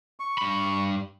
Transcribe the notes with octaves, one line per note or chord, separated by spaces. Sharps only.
C#6
G2 B5